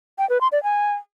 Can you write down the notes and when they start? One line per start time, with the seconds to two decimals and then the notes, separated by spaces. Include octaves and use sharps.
0.18 G5
0.30 B4
0.41 C6
0.52 D5
0.63 G#5